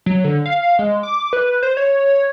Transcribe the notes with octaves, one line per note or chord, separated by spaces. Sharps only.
F#3
D3
F5
G#3
D6
B4
C5
C#5